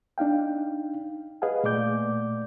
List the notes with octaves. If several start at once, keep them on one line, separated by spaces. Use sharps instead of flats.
D4 D#4 F5 G5
G#4 B4 D#5 F5 F#5 G#5
A#2 A3 D5 D6 G6